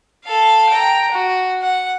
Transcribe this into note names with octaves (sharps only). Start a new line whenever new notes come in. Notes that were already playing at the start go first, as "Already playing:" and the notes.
A4 F5
G5 A#5
F#4
F#5